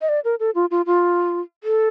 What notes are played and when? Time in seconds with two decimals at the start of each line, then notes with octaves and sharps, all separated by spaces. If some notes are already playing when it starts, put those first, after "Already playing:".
0.01 D#5
0.09 D5
0.24 A#4
0.40 A4
0.55 F4
0.71 F4
0.86 F4
1.64 A4